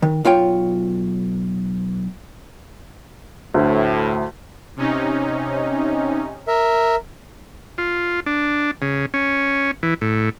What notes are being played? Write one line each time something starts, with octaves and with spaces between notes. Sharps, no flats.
D#3
B1 F4 C#5 G5
D2 A2
C3 C#4 D#4
A#4 E5
F4
D4
C#3
C#4
E3
A2